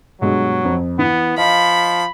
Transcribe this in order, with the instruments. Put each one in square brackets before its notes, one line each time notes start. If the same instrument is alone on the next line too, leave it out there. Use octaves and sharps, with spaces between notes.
[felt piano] G2 B2 G#3 [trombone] F#3
[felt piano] F2
[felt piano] E3 [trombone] B3
[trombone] F3 [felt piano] D#5 F5 [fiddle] B5